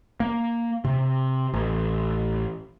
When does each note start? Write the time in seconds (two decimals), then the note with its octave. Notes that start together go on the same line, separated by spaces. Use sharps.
0.20 A#3
0.85 C3
1.54 A1